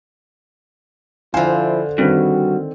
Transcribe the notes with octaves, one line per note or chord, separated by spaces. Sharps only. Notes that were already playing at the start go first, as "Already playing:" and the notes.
D3 F3 E4 C5 F5 G#5
G2 D#3 C4 F#4